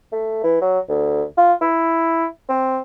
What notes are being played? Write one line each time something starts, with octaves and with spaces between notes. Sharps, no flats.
A3
E3
F#3
D2
F4
E4
C4